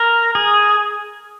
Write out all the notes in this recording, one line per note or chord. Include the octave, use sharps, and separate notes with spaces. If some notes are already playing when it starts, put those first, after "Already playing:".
Already playing: A#4
G#4